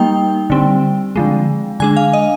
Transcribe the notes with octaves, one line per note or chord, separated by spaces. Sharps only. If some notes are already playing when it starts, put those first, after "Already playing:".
Already playing: G3 A#3 D#4 G5
D3 G3 C4
D3 F3 G#3
D3 G#3 D4 G#5
F5
D#5